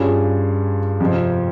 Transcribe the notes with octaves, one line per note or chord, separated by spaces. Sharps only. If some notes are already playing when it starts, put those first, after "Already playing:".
Already playing: G2 G3 C#4 F4 G#4
F2 C3 F3